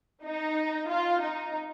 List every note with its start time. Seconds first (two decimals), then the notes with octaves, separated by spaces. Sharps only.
0.24 D#4
0.89 F4
1.22 D#4